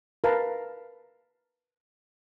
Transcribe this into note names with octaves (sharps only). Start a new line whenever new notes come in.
A#4 B4 F5 A5